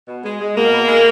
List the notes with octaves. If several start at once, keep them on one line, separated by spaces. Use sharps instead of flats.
B2
G#3
G#3
B2 A#3
B2
G#3